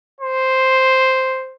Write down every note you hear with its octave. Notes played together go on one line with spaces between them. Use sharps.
C5